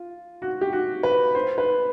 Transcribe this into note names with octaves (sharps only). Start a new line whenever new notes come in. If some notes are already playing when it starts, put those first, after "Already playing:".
Already playing: F4
F#4
G4
F#4
B4
C5
B4